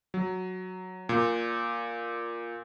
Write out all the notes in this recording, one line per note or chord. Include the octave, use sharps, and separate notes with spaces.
F#3
A#2